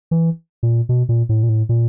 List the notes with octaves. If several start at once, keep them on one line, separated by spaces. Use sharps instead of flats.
E3
A#2
B2
A#2
A2
A#2
A2
A#2